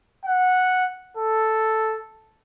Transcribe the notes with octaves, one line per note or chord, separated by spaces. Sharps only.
F#5
A4